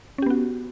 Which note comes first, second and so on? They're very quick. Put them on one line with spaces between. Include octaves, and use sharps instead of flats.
C#4 G4 B3 F#4